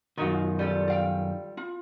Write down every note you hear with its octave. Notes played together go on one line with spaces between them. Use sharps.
F#2 D#3 D#4 F4 F#4 F5
G3 F4 A4
D5 F5 G5
F4